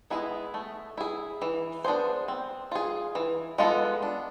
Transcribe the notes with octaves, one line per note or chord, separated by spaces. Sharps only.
G#3 B3 E4 G#4
A3
E4 G#4
E3
B3 D4 G#4 C5
C4
F4 G#4
E3
G#3 B3 F4 A4
D4